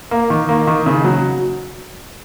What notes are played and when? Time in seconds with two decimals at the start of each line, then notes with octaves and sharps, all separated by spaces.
0.11 A#3
0.30 D#3
0.49 A#3
0.67 D#3
0.86 C#3
1.04 F#3